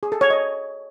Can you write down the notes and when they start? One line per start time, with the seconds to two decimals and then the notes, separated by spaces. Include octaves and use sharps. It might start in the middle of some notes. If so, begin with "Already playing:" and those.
0.03 G#4
0.12 A4
0.21 C#5
0.30 D#5